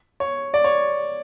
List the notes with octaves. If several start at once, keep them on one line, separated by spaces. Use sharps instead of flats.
C#5
D5
C#5